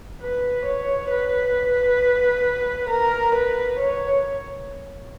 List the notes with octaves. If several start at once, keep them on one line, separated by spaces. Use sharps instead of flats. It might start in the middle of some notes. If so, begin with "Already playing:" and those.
B4
C#5
B4
A#4
B4
C#5